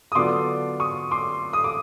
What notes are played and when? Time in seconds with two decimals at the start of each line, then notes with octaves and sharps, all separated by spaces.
0.12 D#6
0.15 D3 F#3 B3 D4 F4 C6 D6
0.80 C#6 D#6
1.11 C6 D6
1.53 D#6
1.64 D6